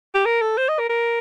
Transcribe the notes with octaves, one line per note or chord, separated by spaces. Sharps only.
G4
A#4
A4
C5
D#5
A#4
A#4